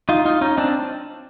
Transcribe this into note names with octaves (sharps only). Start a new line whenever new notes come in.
D#4 F4
D#4 F4
C#4 D#4
C4 D4